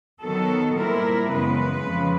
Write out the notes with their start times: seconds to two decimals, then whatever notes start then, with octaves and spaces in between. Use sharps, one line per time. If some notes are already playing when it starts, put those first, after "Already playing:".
0.22 D#3 F#3 B3 A4
0.77 A#2 G3 C4 E4 A#4
1.31 F#2 C#3 E3 G#3 B3 B4
1.86 F2 C#3 F3